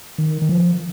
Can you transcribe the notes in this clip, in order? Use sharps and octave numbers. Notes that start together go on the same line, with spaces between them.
D#3
D#3
F3